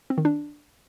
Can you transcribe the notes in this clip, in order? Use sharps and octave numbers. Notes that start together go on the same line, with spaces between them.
C4
D#3
D4